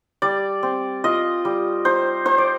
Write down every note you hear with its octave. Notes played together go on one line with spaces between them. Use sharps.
G3 D5
C4
F4 D#5
G3
D#4 C5
D#4 C5
D5